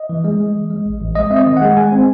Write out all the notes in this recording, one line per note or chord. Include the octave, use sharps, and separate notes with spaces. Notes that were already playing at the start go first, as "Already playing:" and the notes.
Already playing: D#5
E3
G#3
G#3
E3
G#3
A1
A1
G#3 D#5
C4 E5
D#5
D#3
G#3 F#5
G#3 G#5
C4